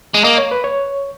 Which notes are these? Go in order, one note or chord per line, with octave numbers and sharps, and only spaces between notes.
G#3
A#3 D#5
C#5
B4
C#5